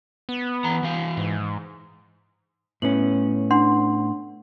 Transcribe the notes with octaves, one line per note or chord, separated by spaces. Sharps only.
B3
E3 A#5
E3 F5
G#2
A2 B3 C#4 F#7
D4 F#5 C6